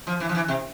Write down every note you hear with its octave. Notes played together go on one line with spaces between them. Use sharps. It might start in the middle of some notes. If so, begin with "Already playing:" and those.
F3
E3
F3
E3
C3